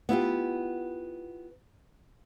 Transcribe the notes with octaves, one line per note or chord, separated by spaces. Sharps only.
B3 E4 F4 G4